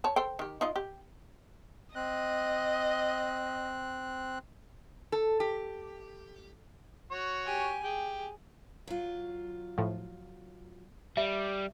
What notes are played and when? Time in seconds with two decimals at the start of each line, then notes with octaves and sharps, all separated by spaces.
0.04 C#5 A5
0.16 A4 C5 G5
0.39 D#3 G4
0.61 D#4 F4 D#5
0.76 G4
1.96 C4 D#5 F#6
5.12 A4
5.40 G4
7.11 F#4 C#5
7.45 G4 G#5
7.84 G4 G#4 G5
8.87 F#3 F4
9.78 A2 F3
11.17 G3 E5